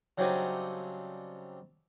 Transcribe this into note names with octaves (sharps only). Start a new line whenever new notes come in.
C#3 F#3 G3 C4 D4 D#4